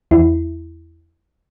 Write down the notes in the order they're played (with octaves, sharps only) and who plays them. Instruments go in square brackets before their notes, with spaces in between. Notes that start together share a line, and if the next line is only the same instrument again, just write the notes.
[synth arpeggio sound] E2 E4